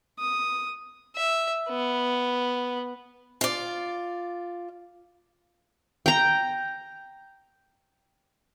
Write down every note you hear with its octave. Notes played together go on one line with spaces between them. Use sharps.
D#6
E5
B3
F4 D5
G5 A#5